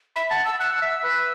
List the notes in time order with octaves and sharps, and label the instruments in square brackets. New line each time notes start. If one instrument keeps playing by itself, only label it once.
[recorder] E5 [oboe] B5
[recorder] F#5 [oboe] A5
[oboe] A5 [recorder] E6
[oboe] F#5 [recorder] E6
[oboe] F#5
E5
B4